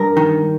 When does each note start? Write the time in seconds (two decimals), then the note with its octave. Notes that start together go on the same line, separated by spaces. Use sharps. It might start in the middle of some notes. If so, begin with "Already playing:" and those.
Already playing: G2 A#4
0.17 D#3